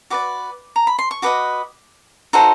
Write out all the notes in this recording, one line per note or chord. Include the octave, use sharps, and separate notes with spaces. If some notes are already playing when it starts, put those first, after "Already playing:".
F#4 B4 D5 D6
A#5
B5
C6
C#6
F#4 B4 D#5 D6
D#4 F#4 A4 C5